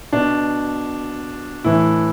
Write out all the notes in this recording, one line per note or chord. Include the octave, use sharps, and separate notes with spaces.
B2 D4
A2 E3 E4